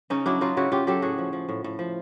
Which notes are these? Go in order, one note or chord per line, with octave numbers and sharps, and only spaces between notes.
C#3 C#4 D#4
F#3 D4 E4
F#3 D#4 F4
C#3 E4 F#4
C#3 F4 G4
F#3 G4 A4
A2 F#4 G#4
F3
F3
A2
A2
F3